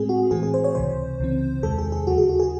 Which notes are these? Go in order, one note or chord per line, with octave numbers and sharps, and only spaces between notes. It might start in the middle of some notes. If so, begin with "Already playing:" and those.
Already playing: A2 G#3 C4 G#4
F#4
A2 E3 C4 G#4
G#4
C5
C#5
C#2 C3 E3 C5
C#2 C#3 E3 C4
E2 C3 D#3 G#3 A4
G#4
G#4
D#2 C#3 F#3 F#4
G#4
F#4
G#4